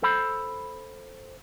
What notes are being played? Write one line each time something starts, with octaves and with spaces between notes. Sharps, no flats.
A4 C5 B5